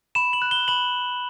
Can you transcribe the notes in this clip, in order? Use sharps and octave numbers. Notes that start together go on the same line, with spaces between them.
B5 E7
F#7
F#6
G7
B5 F#7